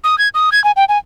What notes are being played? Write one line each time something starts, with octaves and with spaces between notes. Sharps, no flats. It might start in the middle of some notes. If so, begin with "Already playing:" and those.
D#6
G#6
D#6
G#6
G#5
G5
G#5